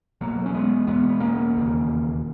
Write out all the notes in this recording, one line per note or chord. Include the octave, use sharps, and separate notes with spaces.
E1 E2 B2 F#3 A#3
C#4
G#3 B3
F#1 E2 B2 G#3 B3
B3
A#3 C#4
E1 D#2 C#3